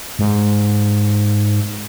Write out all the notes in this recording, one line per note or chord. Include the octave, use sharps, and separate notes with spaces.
G#2